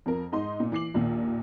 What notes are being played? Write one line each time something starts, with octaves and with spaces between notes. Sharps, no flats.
F2 F3 A#4
G#2 D#4 D#5 C6
A#2
E3 D6 C7 F#7
A#1 D#2 A#2